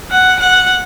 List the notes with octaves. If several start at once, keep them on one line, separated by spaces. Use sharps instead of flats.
F#5
F#5